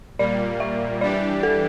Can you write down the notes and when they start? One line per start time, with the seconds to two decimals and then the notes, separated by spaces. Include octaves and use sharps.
0.19 A#2 G3 A#3 D5
0.60 E5
1.01 E3 G3 D4 G4 D5
1.43 A4